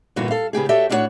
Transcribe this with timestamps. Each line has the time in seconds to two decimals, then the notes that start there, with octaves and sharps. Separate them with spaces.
0.16 G2 A#2 D3 E3 B3 F#4
0.31 A4 F5
0.53 C#3 B3 G4 G#4
0.69 F#4 G4 A4 C#5 D5 E5
0.90 A2 D4 E4 F#4 C#5 F#5